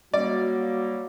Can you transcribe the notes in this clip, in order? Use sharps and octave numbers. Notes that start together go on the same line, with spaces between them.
F#3 G3 A#3 F#4 D5